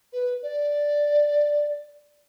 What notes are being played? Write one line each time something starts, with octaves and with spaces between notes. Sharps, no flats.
B4
D5